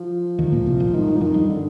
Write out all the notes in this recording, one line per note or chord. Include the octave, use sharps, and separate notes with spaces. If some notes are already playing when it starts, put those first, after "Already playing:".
Already playing: F3
D#2 D#3
A#2 A#3
C2 C3
A#1 A#2
G#1 G#2 D#3
G2
F3
F2 D#3
G2
D3